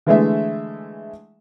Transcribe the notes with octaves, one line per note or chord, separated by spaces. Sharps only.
D3 E3 G#3 A3 G#4 E5